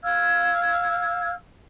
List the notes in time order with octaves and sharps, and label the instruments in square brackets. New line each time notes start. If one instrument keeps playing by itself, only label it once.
[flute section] F5 E6 F6 G#6